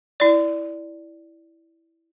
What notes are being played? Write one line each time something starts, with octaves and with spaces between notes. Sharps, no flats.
E4 D5